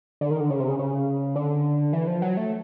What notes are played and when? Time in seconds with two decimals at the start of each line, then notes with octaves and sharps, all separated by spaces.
0.21 D3
0.31 D#3
0.40 D3
0.50 C#3
0.60 C3
0.69 C#3
0.79 C#3
1.36 D3
1.93 E3
2.07 F3
2.22 F#3
2.37 A3